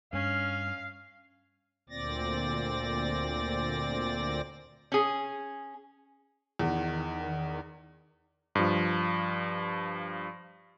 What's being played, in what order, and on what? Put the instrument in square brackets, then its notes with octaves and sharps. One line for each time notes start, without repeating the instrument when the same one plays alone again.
[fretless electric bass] G2 [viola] C#4 [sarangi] F5
[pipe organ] D2 A#2 C4 D5 A6 A#6
[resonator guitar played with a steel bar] C#4 G#4
[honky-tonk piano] E2 [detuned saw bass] D#3
[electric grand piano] G2 F3